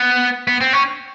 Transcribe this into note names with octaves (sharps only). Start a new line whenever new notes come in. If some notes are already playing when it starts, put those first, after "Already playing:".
Already playing: B3
B3
C4
C#4